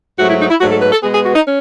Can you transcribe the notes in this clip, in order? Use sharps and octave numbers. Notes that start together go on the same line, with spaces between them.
G#2 F#3 A3 F#4
E4
D#4
E4
G#2 F#3 A3 F#4
A4
B4
A4
B2 G#3 B3 G#4
G#4
F#4
D#4
C#4